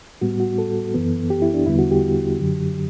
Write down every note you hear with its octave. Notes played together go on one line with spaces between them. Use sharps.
A2 G3 B3 F#4
F#4
A4
F#2 E3 B3
G4
E4
D4
E2 D3 G3 B3 E4
F#4
G4
F#2 D3 F#3